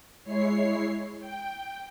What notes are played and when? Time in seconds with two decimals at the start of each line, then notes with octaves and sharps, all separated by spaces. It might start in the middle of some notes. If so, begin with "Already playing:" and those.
0.24 G#3 E4 C#5 C7
1.19 G5